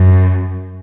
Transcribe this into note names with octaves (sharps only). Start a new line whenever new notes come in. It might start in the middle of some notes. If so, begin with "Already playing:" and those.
Already playing: F#2